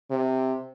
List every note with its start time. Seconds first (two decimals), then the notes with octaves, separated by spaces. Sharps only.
0.11 C3